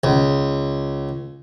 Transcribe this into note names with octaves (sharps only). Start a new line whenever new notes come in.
C#2